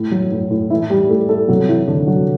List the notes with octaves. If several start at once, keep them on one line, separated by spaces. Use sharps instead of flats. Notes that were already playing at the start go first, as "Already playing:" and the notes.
Already playing: A2
F#3
A2
A2
A2 E3 E4
E3 G3 G4
A2 A3 A4
A2 A3 A4
C3 F#3 F#4
E3 E4
D3 E3 D4
C3 F#3 F#4